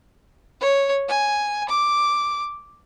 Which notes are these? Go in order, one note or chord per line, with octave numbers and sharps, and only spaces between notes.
C#5
G#5
D6